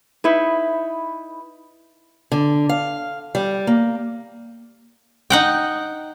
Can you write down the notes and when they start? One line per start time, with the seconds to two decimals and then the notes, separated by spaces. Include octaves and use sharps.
0.24 D#4 E4 B4
2.32 D3
2.69 F5
3.35 G3
3.67 A#3
5.30 D#4 F#5 G5